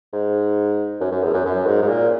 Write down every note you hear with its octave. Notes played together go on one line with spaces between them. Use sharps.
G#2
F#2
F#2
E2
F#2
F#2
G#2
G#2
A#2